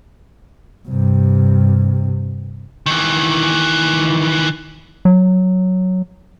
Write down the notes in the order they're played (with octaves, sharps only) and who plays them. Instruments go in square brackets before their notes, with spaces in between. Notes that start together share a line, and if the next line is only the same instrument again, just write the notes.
[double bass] G2 C3
[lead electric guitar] D#3 E3
[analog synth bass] F#3